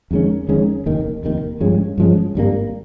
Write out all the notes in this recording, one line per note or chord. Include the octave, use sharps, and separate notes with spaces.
F2 D#3 G#3 C#4
F2 D#3 G#3 C#4
F1 D#2 D#3
F1 D#2 D#3
G2 F3 G#3 C#4
G2 F3 G#3 C#4
G#1 G2 G3 A#3